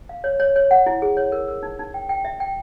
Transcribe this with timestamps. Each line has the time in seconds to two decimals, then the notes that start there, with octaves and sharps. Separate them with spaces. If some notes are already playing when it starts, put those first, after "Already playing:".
0.09 F5
0.24 C#5
0.40 C#5
0.56 C#5
0.71 F#5
0.86 E4
1.02 G#4
1.17 C#5
1.32 A#4
1.48 A#4
1.63 D#4
1.79 D#4
1.94 G5
2.09 G5
2.25 E5
2.40 G5